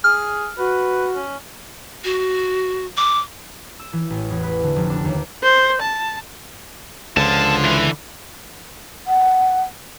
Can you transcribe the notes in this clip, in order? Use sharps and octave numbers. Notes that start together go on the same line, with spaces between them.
G#4 F6
F#4 B4
C#4
F#4
D6
E6
E3
A1
E2
B4
D3
F1
D4
D#2
C5
A5
C#2 D3 F3 F4 A5
E3
F#5